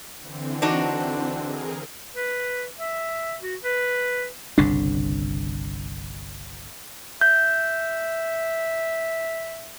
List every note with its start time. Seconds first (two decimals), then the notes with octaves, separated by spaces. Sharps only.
0.18 D3 E3 C4
0.62 D4 D#4 F#4
1.36 G#4 A#4
2.15 B4
2.78 E5
3.42 F#4
3.64 B4
4.58 G1 C2 C#3 D4
7.21 E5 G6